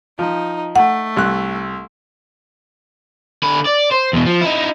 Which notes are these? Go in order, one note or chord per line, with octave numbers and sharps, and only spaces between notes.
F3 D#4
A3 F#5
C2 F#6
D3 B5
D5
C5
E2 B2
F3
D#4 E4